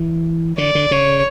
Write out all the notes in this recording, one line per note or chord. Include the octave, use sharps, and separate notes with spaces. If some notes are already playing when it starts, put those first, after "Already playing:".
Already playing: E3
D3 D5
D3
C#3 C#5